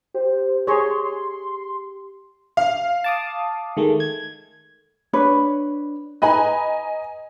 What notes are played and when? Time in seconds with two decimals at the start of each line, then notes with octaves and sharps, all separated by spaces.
0.14 G4 C5
0.67 G#4 C#5 C6
2.57 F5
3.04 A5 D6 D#6
3.77 D#3 G#3 A3
4.00 G#6
5.13 D4 B4 C#5
6.22 B4 D#5 G#5 A#5 B5